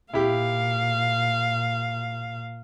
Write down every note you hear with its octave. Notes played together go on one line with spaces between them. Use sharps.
A#2 E4 G4 F5